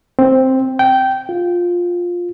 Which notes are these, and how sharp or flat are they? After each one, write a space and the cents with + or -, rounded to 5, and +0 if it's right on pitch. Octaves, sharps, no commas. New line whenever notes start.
C4 +5
G5 -15
F4 +10